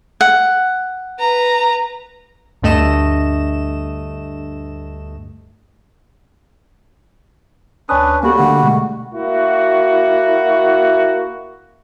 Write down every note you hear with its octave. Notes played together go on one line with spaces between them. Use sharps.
F#5
B4 A#5
D2 G2 A3 D#5 E7
D2 C#4 D4 B4 D#6
G3 A#3 B3 F#4 G4 A4
D3 A3 A#3 F#5
B2 G#3 A3
A#3 E4 F#4